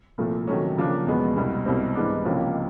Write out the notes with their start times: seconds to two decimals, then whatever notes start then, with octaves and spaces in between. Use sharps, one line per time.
0.18 C2 A#2 F3 A3
0.47 C3 D#3 F#3 A3 C#4
0.77 C#3 F3 A#3 D4
1.07 E2 B2 G#3 B3
1.36 C2 B2 G3
1.66 C2 B2 G3 C4
1.95 G#2 E3 G#3 B3 D4
2.25 C#2 C3 F3 A#3 C#4